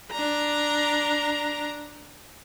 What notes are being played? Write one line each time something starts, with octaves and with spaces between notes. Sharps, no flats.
D4 A#5